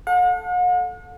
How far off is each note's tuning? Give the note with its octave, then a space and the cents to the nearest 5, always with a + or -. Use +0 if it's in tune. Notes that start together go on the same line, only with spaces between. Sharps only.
A4 +0 F#5 -45